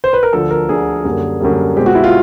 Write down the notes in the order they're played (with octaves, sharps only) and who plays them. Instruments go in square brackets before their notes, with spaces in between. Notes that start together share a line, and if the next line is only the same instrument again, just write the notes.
[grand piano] C5
B4
A#4
D2 D3 F3 A4
A#4
D2 D3 F3 G#4
F#2 D3 G3 A#3
F#2 D3 G3 A#3
B2 G#3 C4 G4
F#4
E4
F4